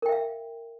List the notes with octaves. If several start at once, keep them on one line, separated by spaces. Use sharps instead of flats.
A#4 E5 F5 G5